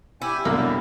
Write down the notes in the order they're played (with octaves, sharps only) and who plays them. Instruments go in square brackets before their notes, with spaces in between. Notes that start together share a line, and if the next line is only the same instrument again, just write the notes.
[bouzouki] E4 [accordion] G4 G#5
[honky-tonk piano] C2 F#2 B2 [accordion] D3 G3 [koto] A#3